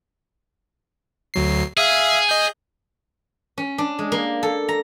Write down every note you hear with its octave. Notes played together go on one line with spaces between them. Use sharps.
D2 F#3 C7
G#4 E5 F5
D#5 G6
C#4
D4
G#3
A#3
A4
A#5